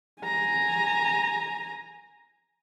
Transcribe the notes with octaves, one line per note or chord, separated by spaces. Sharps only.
G#5 A#5